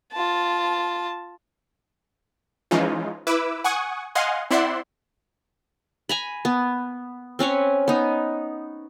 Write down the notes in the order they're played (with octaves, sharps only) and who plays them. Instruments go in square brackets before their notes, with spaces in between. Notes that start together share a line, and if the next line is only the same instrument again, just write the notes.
[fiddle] F4 A5
[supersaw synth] E3 F3 G#3 C#4 D#4 F4
E4 B4 D6 E6
F#5 G#5 C#6 D#6
D#5 F5 F#5 G#5 C6
C4 E4 D5 E5 F#5 C6
[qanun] G#5 A#5 B5
B3
C4 C#4 B4 C#5
B3 D#4